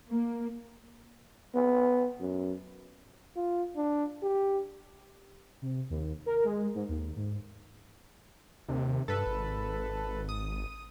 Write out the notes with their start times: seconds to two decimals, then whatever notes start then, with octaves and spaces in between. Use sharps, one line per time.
0.11 A#3
1.55 B3
2.20 F#2
3.36 F4
3.77 D4
4.23 G4
5.62 C3
5.90 D#2
6.26 A#4
6.44 G#3
6.75 G#2
6.89 D#2
7.16 G#2
8.68 D#2 C3
9.08 G2 A4 B4
9.26 G#1
10.29 D#6